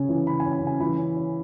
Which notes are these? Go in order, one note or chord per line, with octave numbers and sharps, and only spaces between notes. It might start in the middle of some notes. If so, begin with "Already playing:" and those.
Already playing: C#3 C#4
E3
C#3 B5
G#5
C#4
G#5
C#3
G#5
E3 B5
C#4
C#4